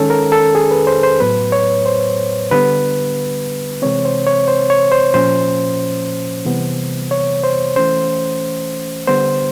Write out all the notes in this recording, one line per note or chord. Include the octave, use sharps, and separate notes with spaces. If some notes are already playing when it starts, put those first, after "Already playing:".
Already playing: D#3 G#3 C#4 A4
A#4
A4
G#4
B4
C5
C5
A2 F#3 B3 B4
C#5
C5
D3 G3 B3 B4
C3 E3 G#3 C4 C#5
C5
C#5
C5
C#5
C5
A#2 F3 A#3 C#4 C5
C3 E3 G3 B3
C#5
C5
E3 A3 C#4 C5
D3 G3 B3 C5